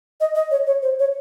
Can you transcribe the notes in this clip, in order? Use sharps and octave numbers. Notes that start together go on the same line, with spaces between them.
D#5
D#5
C#5
C#5
C5
C#5